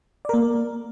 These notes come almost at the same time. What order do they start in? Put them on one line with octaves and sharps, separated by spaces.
D5 A#4 A#3